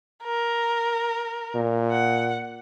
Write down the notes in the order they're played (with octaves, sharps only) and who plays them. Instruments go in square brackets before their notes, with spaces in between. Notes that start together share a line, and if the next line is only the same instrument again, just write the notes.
[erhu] A#4
[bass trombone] A#2
[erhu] F#5